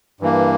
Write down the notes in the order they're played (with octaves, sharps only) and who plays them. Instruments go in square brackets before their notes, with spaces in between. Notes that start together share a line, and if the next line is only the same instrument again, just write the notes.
[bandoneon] G2 E3 A#3